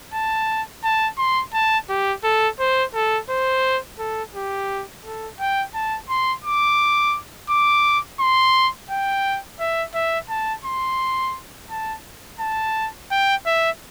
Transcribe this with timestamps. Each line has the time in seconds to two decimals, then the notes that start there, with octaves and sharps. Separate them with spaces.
0.13 A5
0.84 A5
1.18 C6
1.53 A5
1.89 G4
2.24 A4
2.59 C5
2.95 A4
3.30 C5
3.99 A4
4.34 G4
5.05 A4
5.40 G5
5.74 A5
6.09 C6
6.45 D6
7.50 D6
8.20 C6
8.90 G5
9.60 E5
9.94 E5
10.29 A5
10.64 C6
11.70 A5
12.40 A5
13.11 G5
13.46 E5